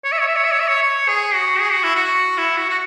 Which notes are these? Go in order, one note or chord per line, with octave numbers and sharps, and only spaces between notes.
C#5
E5
C#5
E5
C#5
E5
C#5
E5
C#5
C#5
G#4
F#4
G#4
F#4
E4
F#4
E4
F#4
F#4